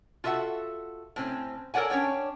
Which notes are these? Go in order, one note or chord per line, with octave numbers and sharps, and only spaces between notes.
F4 F#4 A4 E5 F#5
A2 C4 C#4
A4 A#4 C#5 D5 F#5 G#5
C#4 D4 C#5 G5